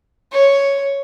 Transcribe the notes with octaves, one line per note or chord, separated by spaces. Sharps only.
C#5